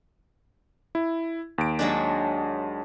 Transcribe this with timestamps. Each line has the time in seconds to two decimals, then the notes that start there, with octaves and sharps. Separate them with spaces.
0.95 E4
1.58 D#2 D7
1.79 F#3 G#3 D4